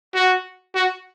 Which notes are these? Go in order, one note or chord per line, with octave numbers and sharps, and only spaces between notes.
F#4
F#4